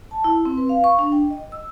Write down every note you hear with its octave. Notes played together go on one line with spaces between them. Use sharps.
A5
E4
C4
B4
F5
C#6
D4
G5
D#5
E6